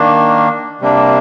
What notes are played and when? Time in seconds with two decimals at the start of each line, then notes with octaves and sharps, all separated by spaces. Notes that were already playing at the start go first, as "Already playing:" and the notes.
Already playing: D#3 A#3 D4
0.81 C3 G3 A#3 D4